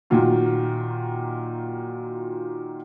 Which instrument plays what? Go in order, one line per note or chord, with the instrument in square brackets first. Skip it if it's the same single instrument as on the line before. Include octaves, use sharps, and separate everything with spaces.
[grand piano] A#2 D#3 F#3 F4 F#4